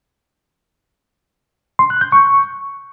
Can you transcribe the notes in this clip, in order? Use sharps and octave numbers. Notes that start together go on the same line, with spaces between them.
C6
F#6
G6
C#6